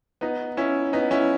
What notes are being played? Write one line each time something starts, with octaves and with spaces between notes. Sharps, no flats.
B3 D#4
C#4 E4
B3 D#4
C#4 E4